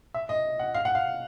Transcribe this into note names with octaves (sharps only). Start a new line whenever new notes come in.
E5
D#5
F#5
F5
F#5
F5